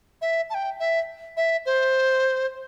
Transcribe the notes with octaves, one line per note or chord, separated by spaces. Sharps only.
E5
A5
G5
E5
E5
C5